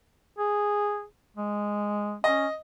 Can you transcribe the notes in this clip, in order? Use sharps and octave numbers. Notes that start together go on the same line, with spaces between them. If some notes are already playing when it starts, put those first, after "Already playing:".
G#4
G#3
C#4 D#5